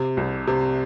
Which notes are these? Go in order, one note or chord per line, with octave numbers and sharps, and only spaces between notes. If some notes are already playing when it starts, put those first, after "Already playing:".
Already playing: C3
C2
C3